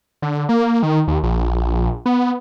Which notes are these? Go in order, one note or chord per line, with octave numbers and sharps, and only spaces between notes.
D3
A#3
D#3
D#2
A#1
B3